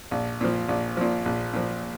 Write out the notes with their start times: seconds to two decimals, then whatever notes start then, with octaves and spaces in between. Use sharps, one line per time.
0.11 A#1
0.41 A#2 F3
0.68 A#1
0.97 A#2 F3
1.25 A#1
1.53 A#2 F3